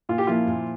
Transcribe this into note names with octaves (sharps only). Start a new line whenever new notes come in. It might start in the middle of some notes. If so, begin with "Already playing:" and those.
A#2 F4
G4
F3 A#3 E4 F4
A#2